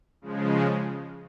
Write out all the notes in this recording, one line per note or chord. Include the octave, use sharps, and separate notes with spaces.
C#3 F3 G#3